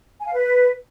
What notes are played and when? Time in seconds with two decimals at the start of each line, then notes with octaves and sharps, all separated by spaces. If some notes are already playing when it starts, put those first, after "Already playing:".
0.19 G#5
0.26 F5
0.33 B4